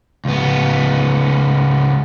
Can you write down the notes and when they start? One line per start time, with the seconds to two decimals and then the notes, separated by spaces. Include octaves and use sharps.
0.25 C#2 B3